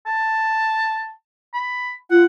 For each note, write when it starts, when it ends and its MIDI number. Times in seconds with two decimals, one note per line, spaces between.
0.06 1.10 81
1.54 1.92 83
2.11 2.24 65
2.11 2.25 78